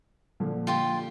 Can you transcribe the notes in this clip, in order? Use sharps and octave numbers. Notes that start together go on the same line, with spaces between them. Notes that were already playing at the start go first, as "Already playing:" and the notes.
A#2 D3 F3
F4 G4 C6